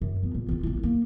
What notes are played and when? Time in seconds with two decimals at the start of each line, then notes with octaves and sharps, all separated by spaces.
0.01 F#2
0.22 A#2 B3
0.35 A#2
0.49 C4 F4
0.63 A#1 E4
0.83 A#3